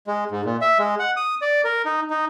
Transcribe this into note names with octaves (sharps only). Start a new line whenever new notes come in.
G#3
G#2
A#2
E5
G#3
F#5
D#6
D5
A#4
D#4
D#4